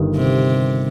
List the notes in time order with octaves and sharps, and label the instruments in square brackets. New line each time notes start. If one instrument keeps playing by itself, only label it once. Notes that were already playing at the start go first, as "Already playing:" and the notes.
Already playing: [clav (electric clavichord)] G1 G2 D#3
[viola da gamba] C3